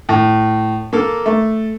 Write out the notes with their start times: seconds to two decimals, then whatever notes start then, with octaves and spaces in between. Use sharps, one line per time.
0.09 A2
0.93 A#3 A4
1.26 A3